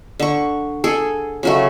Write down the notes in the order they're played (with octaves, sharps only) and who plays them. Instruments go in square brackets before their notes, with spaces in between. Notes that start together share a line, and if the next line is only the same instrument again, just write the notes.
[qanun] D3 C#6
G#4 A4
C#3 F#3 A3